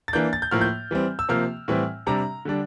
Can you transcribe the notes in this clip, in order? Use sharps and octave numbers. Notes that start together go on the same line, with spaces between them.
A6
E3 A#3 D4 G6
A6
G6
A2 F3 A#3 F6
G6
E3 G3 C4
E6
C3 F3 A#3 F6
A2 E3 G3 C4
C3 G3 D4 A#5
D3 G3 D4